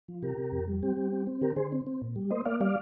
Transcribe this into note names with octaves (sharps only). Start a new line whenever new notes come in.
F3
C3 G4 A#4
C3
F2
G3
C4 G4
G3
C4
C4
D3 G4 A#4
D3 G#4 C5
C4
C4
A#2
G3
A#3 C5 D#5
A#3 D5 F5
G3 D5 F5